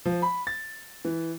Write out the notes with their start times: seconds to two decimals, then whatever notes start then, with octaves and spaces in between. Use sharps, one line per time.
0.05 F3
0.22 B5
0.47 A6
1.05 E3